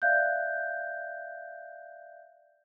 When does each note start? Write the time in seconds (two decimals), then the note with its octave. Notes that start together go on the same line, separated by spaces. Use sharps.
0.02 D5 E5 F5 F#6 G6